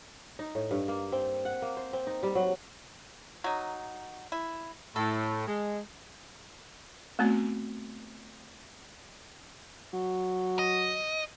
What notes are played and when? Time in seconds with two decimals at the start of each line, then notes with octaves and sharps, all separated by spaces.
0.39 D#4
0.55 A2
0.71 G2
0.88 A#3
1.12 C4
1.45 F#5
1.62 A#3
1.77 C5
1.93 C4
2.07 D#4
2.23 G3
2.35 F#3
3.44 F#3 D#4
4.32 E4
4.96 A2 A4
5.46 G#3
7.19 A3 B3 C4 F#4
9.93 F#3
10.59 D#5